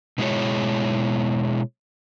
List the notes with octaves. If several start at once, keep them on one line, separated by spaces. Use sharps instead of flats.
B2 G#3 E4 G#4 C#5